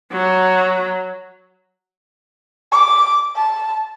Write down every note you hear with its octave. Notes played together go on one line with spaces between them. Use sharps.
F#3
D6
A5